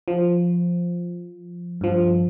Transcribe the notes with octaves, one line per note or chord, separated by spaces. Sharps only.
F3
G2 F3